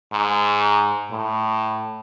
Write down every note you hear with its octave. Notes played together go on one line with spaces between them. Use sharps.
G#2
A2